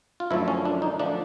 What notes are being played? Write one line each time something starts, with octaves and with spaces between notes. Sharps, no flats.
F4
F#2 D3 F3 A3 E4
C#4
D4
D#4
D3 F3 A3 D4